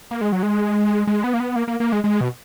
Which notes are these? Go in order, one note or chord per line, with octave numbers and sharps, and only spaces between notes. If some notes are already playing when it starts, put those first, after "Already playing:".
A#3
G#3
F#3
G#3
G#3
B3
A#3
B3
A#3
A#3
A#3
G#3
G#3
B2